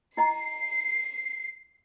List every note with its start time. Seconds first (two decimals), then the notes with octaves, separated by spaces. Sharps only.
0.17 E4 D#5 A#5 C7